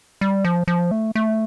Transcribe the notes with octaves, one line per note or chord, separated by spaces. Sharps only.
G3
F3
F3
A3
A3